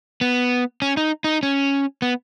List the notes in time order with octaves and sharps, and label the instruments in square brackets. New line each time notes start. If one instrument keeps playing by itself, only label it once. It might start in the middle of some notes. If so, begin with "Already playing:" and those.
[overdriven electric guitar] B3
C#4
D#4
D#4
C#4
B3